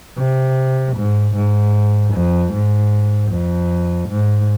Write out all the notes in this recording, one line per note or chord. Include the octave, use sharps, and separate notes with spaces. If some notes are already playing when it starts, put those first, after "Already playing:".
C3
G#2
G#2
F2
G#2
F2
G#2